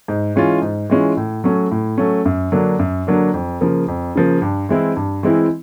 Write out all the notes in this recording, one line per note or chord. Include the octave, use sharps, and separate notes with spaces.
G#2
E3 G#3 C#4 F4
G#2
E3 G#3 C#4 F4
A2
F#3 A3 C#4
A2
F#3 A3 C#4
F#2
D3 F#3 A#3 D4
F#2
D3 F#3 A#3 D4
F2
C#3 F3 A#3
F2
C#3 F3 A#3
G2
E3 G#3 C4 E4
G2
E3 G#3 C4 E4